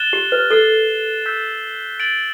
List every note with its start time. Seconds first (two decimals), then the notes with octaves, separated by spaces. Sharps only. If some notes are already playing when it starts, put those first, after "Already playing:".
Already playing: F#6 A6 E7 G7
0.13 G4
0.32 B4
0.50 A4 A6 C7 G7
1.26 E6 G6 B6
2.00 A6 D7 F#7